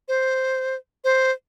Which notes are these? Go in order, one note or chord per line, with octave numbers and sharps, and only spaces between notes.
C5
C5